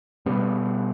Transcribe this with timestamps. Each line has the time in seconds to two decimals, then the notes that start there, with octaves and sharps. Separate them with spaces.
0.26 B2 G3 B3